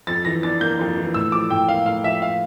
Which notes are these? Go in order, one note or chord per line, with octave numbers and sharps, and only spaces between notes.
F2 A6
E3 A#6
D4 A6
A#3 G6
F2
E3
A2 E6
F3 D6
A2 G5
A#3 F5
A2 F5
F3 E5
F5